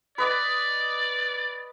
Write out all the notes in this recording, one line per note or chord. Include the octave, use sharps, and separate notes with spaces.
B4 D5 D#5 D6